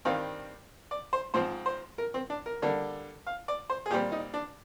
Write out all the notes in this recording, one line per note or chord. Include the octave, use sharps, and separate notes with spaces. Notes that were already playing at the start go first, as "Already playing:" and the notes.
G2 D#3 G3 C4 F5
D5
C5
G#2 F3 C4 C5
C5
A#4
C4
D4
A#4
D3 G3 A#3
F5
D5
C5
G#4
A#2 G3 C4 G4
D#4
D4